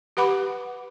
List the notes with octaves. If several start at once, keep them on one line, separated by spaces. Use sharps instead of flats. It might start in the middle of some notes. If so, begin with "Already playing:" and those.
G4 B4 F#5 B5 D6